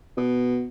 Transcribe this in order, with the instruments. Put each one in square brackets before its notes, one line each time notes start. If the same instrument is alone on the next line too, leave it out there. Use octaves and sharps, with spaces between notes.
[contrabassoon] B2